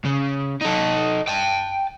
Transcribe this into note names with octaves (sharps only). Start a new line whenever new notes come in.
C#3
D#4 A4
G5 A5